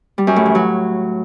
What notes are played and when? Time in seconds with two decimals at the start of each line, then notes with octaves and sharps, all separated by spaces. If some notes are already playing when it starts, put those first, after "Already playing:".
0.18 G3
0.27 F#2
0.36 A2
0.46 E3
0.55 F#3